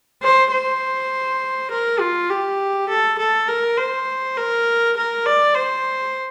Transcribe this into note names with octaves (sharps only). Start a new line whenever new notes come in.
C5
C5
A#4
F4
G4
A4
A4
A#4
C5
A#4
A#4
D5
C5